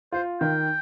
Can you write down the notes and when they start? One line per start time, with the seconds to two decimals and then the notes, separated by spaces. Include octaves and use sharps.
0.12 F4 C5
0.41 D#3 G5